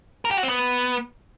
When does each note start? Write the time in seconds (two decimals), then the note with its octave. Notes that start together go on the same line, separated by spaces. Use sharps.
0.25 A#4
0.31 G4
0.37 F#4
0.43 C4
0.49 B3